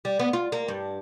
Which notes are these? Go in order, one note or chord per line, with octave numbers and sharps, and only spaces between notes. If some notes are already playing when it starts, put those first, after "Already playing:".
G3
B3
F4
A#3
G2